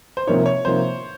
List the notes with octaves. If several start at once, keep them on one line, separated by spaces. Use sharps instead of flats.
C5
C3 F3 A#3 D#4 C#5
C#5
C3 F3 A#3 D#4 C5